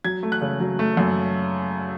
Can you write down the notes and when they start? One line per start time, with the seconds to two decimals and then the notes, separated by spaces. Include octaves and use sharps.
0.04 F#3 G#6
0.23 A3
0.32 F#6
0.42 C#3
0.60 F#3
0.79 A3
0.97 F#2